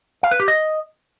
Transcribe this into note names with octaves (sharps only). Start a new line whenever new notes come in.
F5
B4
G4
D#5